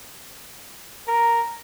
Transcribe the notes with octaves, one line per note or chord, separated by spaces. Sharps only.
A#4